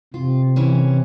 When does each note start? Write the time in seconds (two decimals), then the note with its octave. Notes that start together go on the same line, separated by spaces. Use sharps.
0.14 C3 F4
0.56 E3 C#4